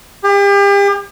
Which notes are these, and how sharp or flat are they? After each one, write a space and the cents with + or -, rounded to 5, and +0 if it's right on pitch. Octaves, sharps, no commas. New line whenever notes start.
G4 +40